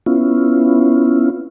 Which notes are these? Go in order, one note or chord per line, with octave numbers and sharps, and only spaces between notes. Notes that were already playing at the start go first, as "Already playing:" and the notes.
B3 C#4 E4 F4